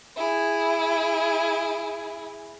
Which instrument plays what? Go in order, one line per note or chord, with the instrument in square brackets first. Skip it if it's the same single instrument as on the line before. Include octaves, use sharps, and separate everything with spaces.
[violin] E4 G#4